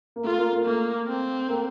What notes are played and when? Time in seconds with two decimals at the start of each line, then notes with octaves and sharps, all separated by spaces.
0.16 A#3
0.24 A3 F4
0.38 A#3
0.53 A#3
0.65 A3 A#3
1.07 C4
1.48 A#3